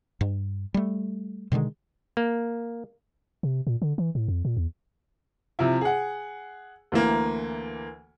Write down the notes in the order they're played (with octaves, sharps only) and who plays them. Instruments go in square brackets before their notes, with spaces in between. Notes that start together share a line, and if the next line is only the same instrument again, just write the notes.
[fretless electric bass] G2
G3 A3
B2 D3 D#3 G#3
[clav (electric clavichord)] A#3
[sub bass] C3
A#2
D3
E3
A2
F2
A#2
E2
[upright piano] C3 F3 E4
G#4 F#5
D2 E3 A#3